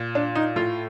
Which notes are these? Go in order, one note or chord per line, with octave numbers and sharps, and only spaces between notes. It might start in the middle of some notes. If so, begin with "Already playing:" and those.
Already playing: A#2
D4
D#4
A2 F4